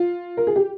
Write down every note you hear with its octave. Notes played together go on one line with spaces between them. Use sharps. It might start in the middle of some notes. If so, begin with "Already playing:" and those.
Already playing: F4
A#4
G#4
G4